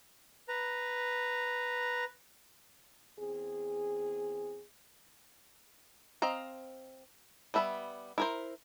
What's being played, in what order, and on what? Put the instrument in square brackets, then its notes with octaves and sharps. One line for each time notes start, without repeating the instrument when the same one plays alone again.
[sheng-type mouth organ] B4 A#5
[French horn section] E2 C4 G#4
[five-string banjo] C4 D#5 F5 A#5
G3 B3 E5 A#5 B5
E4 A#4 C5